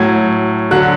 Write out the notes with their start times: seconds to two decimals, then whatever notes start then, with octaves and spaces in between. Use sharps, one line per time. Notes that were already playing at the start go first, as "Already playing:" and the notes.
Already playing: A2 F#3 G#6
0.71 D3 F#3 F#6